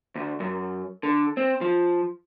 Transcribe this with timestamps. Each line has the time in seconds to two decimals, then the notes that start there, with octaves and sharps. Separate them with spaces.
0.15 D2
0.40 F#2
1.03 D3
1.37 C4
1.61 F3